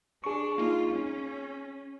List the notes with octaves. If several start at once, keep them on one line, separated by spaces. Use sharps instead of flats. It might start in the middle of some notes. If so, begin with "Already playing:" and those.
D4 G#4 C#6
A#3 D#4 F4
C#4